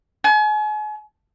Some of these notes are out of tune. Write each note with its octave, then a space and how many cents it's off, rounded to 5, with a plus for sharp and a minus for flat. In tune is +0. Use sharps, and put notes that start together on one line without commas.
G#5 +40